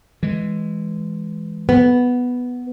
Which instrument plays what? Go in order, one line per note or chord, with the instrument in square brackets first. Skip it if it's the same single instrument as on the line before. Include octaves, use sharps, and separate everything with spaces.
[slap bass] E3 G#3
[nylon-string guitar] B3